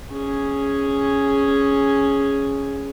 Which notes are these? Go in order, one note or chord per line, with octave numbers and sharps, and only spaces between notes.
C#4 G#4